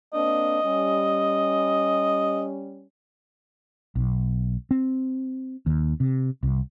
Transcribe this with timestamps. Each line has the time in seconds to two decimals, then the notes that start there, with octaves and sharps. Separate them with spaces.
0.14 A#3 C4 D4 D#5
0.65 G3 C#4
3.95 B1
4.71 C4
5.66 D#2
6.00 C3
6.43 C2